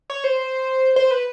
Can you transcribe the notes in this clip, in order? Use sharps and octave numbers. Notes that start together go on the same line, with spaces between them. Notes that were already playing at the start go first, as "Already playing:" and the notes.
C#5
C5
C5
B4